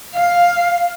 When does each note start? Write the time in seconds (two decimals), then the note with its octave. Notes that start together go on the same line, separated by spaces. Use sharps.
0.14 F5